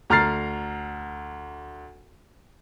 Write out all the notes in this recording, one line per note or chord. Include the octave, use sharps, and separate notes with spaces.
D2 A#5 F6 A6 C7